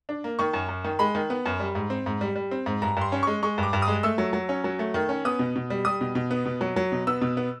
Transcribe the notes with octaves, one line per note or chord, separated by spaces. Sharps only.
D4
A#3
D#3 C#6
F#2
F#2
D#3
G#3 B5
D#3
B3
F#2
G3
G#2
C4
G#2
G3
G3
C4
G#2
G2 A#5
G2 C6
C#4
G#3 C#6
G#3 C#6
G2 D6
G2
D#6
G#3
A3 E6
F#3
F#3
C#4
F#3
A3
D#3
C#4
B3 D#6
B2
B2
G3
G3 D#6
B2
B2
B3
B2
F#3
F#3
B2
B3 E6
B2
B3